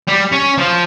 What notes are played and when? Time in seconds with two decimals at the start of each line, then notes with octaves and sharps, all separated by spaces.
0.08 G3
0.32 C#4
0.58 F3